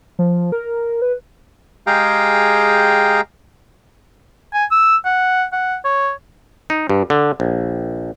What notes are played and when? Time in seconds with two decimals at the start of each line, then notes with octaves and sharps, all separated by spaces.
0.19 F3
0.52 A#4
1.02 B4
1.87 G#3 G4 G#4 F5 G5 A#5
4.54 G#5
4.71 E6
5.05 F#5
5.53 F#5
5.85 C#5
6.70 D#4
6.89 G2
7.10 D3
7.40 A#1